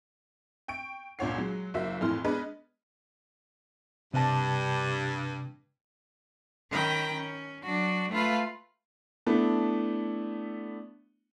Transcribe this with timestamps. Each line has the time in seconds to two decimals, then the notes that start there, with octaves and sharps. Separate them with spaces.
0.68 G5 C#6 D7
1.19 C#2 A#2 D4 C#5 F#5 C7
1.38 F#3 G#3
1.74 F#1 A#3 F#4 E5
2.01 F2 A2 E3 C6 F6
2.24 G#3 B3 D4 G#4 B4 D#5
4.14 G2 C3 A5
6.70 D#3 C#4 G5 A#5 B5
7.14 C#4
7.63 F#3 D4 F#4
8.11 A3 F4 B4 F5
9.26 A3 B3 D4 E4